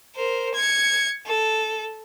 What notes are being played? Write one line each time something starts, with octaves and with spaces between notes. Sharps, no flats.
A#4 C5
G#6 C#7
A4